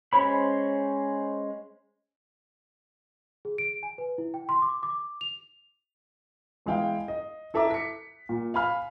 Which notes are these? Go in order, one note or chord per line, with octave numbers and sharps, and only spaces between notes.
G#3 C#4 C5 C#5 B5
G#4
D7
G#5
B4
E4
G5
C6
D6
D6
F7
E2 G#3 E4 F5 G5
D#5
E4 A4 E5 A#5 D6
B6 C#7
A#2
F5 G#5 B5 F6